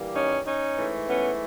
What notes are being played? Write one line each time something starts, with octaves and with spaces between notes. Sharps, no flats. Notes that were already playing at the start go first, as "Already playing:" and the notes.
Already playing: G2 E3 G3 A#3
C#4 D#4
C#4 D#4
G#2 E3 A3
B3 C#4